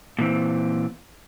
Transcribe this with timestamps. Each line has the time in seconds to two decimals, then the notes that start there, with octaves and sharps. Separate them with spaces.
0.19 A#2 E3 C4